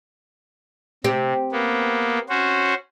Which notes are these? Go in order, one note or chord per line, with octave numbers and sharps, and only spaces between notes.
C3 C4 G4
A#3 B3
C#4 F#4 C5